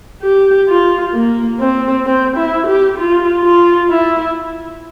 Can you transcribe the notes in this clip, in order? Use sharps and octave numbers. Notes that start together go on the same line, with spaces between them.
G4
F4
A#3
C4
C4
E4
G4
F4
F4
E4